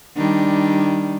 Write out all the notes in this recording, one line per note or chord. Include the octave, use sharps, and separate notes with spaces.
D#3 G3 D4